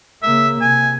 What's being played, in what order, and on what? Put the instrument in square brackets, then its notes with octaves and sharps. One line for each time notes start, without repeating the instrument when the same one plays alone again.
[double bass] C#3 A#3 [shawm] E5
[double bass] C3 [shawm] G#5